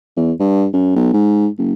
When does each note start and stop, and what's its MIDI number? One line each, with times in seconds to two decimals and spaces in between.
0.17 0.32 40
0.40 0.67 43
0.73 0.94 42
0.96 1.13 35
1.13 1.48 44
1.58 1.74 30